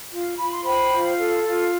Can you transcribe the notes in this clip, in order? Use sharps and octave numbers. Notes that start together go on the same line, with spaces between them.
F4
F4 B5
C6
C5 G5 B5
F4
A4
F4